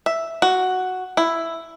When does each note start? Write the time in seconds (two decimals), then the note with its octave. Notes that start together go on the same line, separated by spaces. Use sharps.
0.06 E5
0.42 F#4
1.17 E4